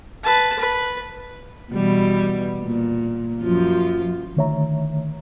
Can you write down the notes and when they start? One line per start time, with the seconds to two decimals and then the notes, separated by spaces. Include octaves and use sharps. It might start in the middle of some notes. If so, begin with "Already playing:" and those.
0.24 B4 A5
0.59 B4
1.72 B2 E3 G3
2.64 A#2
3.42 F#2 F3 F4
4.36 D3 D#3 A3 C#5 E5 A#5